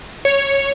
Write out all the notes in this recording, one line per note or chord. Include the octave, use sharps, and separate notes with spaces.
C#5